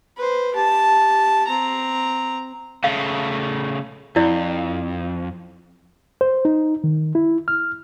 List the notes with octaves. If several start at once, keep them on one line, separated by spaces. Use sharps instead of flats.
B4 C5
G4 A5
C4 A#5
C#3 A3 F5
F2 E4 D5
C5
D#4
D#3
E4
F6